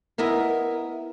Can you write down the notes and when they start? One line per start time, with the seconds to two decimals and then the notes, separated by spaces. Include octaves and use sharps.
0.18 B3 E4 A#4 D#5 E5